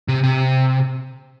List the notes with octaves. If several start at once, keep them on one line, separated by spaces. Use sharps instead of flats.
C3
C3